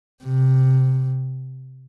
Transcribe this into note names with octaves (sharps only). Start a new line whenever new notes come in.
C3